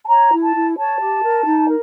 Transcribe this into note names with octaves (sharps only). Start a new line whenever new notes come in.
A5
C#5 A#5
E4
A5
E4
C#5 A5
G4
A#4
D#4
A#4